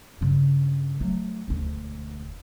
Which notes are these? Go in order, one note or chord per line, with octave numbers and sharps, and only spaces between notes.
G2 C#3
F#3 A3
E1 D2